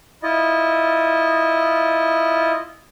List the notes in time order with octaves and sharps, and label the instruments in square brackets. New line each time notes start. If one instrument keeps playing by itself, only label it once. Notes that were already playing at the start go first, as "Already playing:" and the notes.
[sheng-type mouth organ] E4 F4 D#5